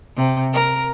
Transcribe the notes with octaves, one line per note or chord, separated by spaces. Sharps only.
C3
A#4